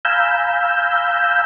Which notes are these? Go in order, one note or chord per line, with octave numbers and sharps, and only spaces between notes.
F5 G#5 A#5 B5 E6 G6